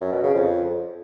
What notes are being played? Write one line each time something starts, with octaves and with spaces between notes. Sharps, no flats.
F#2
B2
C#3
F2